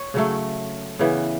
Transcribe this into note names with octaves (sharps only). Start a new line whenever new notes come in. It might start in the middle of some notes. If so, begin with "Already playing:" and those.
Already playing: C#5
C#3 F#3 A3
C#3 E3 B3